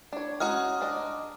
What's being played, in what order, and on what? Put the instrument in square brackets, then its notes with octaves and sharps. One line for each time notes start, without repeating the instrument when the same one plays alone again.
[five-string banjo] D4 C#5
[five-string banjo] G#3 C#4 F#4 [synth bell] A#5 D#6 F6
[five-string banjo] G#3 D4 D#5